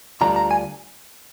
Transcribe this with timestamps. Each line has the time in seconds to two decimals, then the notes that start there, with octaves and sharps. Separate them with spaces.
0.21 D2 D3 G3 D4 F4 A#5
0.36 A#5
0.51 G#5